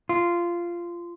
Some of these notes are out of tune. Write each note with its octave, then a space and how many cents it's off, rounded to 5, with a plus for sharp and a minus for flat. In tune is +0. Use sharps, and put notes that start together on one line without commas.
F4 -15